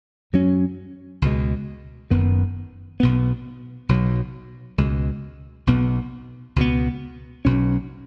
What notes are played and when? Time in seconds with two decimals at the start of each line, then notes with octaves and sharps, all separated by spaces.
0.33 F#2 F#3 C#4
1.22 C#2 B2 G#3
2.10 F#1 F#2 D#3 B3
3.00 B1 B2 B3
3.89 B1 B2 F#3
4.78 C#2 B2 G#3
5.67 B1 B2 B3
6.56 C#2 B2 B3
7.45 B1 B2 F#3 C#4